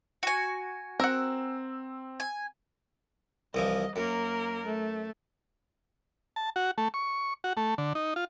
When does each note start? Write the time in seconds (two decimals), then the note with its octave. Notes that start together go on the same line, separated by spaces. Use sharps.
0.23 F#4 G#5
1.00 C4 A#4 F#5 E6
2.20 G#5
3.54 C2 E3 F3 D#5
3.96 F#2 A#3 A#4
4.66 A3
6.36 A5
6.56 F#4
6.78 A3
6.94 C#6
7.44 F#4
7.57 A3
7.78 D3
7.95 D#4
8.16 F4